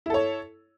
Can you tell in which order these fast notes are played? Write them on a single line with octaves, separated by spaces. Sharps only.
E4 A4 C#5